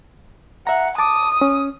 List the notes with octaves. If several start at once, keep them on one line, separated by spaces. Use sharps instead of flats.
E5 F#5 A#5
A5 D6 D#6
C#4